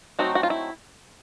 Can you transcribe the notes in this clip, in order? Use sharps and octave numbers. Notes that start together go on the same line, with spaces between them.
F#3 A3 C4 D#4 F#4
F#4
F4
E4